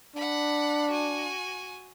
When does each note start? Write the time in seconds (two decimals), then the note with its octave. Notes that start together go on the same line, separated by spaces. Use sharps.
0.16 D4 F#5 B5
0.90 F#4 G#5